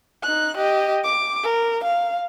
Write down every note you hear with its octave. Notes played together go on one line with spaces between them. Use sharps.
D#4 F#6
G4 D#5
D6
A#4
F5